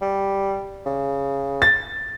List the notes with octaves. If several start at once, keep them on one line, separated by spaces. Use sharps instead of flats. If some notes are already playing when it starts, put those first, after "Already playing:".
G3
C#3
A6